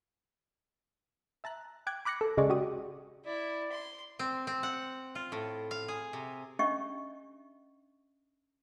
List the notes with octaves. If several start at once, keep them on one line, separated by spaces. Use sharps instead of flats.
E5 A5 A#5 F#6
G5 D6 F#6 G#6
B5 D6 F#6 A#6 C#7
A4
C#3 G#3 C#5 D5
F#4 G4 D#6
E4 D5
C6
C4
C4
F#5
F4
A2
F5
G#4
C3
C#4 D4 G4 D#5 E5 C#6